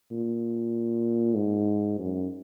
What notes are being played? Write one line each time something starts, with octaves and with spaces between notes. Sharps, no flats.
A#2
G#2
F#2